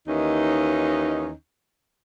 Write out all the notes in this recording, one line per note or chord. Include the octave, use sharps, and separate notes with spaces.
D#2 E3 C#4 D#4